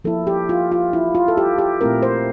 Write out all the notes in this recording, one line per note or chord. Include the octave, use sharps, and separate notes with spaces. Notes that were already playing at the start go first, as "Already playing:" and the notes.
F3 A#3 E4 A4
G4
F4
F4
E4
F4
A4
G4
G4
A#2 A3 C4 E4 A#4
C5